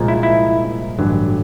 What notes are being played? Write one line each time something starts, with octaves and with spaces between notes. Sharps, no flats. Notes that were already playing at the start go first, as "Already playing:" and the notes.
Already playing: C2 A#2 F3 G#3
E4
E4
A1 G2 D3 F#3